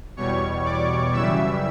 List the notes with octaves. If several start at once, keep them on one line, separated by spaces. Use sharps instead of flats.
E2 B2 G3 C#5 C#6
D5 D6
F#2 C#3 E3 G3 E5 E6